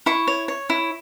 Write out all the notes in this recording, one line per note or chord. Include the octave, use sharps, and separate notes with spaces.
E4 C#6
C#5
C#5
E4